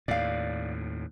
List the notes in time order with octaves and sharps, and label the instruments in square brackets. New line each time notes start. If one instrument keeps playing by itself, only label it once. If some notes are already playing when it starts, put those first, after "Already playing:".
[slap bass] D#2 A2 [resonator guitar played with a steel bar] D5 F5